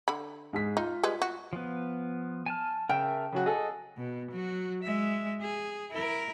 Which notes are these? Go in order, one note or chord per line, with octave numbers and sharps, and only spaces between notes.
D3 B5
G#2 G#4 B6
D#4 F4
G3 G#3 B4
F#4
F3 B3
G#5 A5 F6
C#3 A#4 E5 G5 A5
C#3 F#3 F#4
G#4 A4 D#5 F#5
B2
F#3 F#4
G#3 E5
G#4
E4 A#4